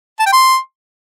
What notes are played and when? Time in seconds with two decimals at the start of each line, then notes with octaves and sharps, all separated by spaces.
0.20 A5
0.26 G5
0.33 C6